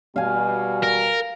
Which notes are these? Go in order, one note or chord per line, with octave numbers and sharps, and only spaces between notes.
B2 G3 F5 G#5
A#4